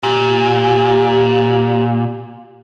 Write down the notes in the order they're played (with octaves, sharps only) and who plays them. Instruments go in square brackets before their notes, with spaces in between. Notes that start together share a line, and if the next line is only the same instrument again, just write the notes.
[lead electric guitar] A#2 [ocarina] G4